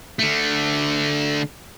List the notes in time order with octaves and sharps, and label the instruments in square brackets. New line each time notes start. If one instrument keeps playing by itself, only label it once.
[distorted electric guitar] D3 A3